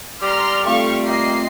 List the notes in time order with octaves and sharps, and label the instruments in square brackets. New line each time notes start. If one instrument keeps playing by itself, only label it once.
[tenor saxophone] G3 [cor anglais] D5 [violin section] A#5 C6 F6
[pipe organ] A3 C4 F4 [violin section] A4 F5 C#6
[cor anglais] A#3 [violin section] D#5 C7